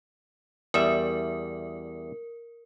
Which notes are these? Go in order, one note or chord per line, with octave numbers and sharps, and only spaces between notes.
E2 G3 A#4 E5